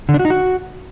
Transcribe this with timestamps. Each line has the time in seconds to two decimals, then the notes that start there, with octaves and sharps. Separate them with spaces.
0.09 D3
0.14 D4
0.19 F#4
0.25 D#4
0.30 F#4